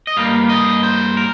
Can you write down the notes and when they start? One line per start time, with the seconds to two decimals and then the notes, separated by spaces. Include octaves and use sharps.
0.07 D#5
0.17 G2 G3 A#3 F5
0.49 D#5
0.83 C5
1.17 A#4